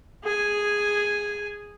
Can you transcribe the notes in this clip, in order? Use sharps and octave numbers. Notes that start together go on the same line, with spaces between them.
G#4 G#5